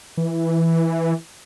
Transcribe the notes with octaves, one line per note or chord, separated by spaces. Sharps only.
E3